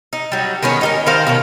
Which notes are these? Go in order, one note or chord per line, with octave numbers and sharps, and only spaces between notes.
D#4
F#3 G3
D#3 G#3 B3 C#4
D#4 G4 A#4
D#3 A#4 C5 F5
B2 F3 C#4